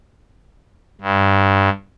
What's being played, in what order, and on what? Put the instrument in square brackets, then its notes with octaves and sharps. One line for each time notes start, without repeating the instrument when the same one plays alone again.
[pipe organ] G2